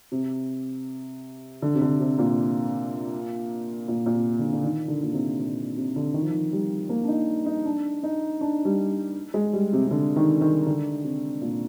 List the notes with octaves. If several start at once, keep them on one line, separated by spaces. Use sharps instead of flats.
C3
D3
C3
D3
C3
A#2
A#2
A#2
C3
D3
C3
D3
D#3
D3
A#2
C3
A#2
C3
D3
D#3
F3
D#3
G3
A#3
D4
D#4
D#4
D4
D#4
D4
G3
G#3
G3
C3
C3
D3
D#3
D#3
D3
C3
A#2